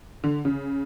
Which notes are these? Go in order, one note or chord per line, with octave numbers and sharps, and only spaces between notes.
D3
C#3